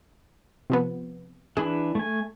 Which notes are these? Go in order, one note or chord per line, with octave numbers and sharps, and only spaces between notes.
C3 F3 B3
E3 D4 G#4 B5
A3 G#5